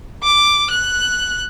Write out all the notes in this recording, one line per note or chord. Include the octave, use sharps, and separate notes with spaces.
D6
F#6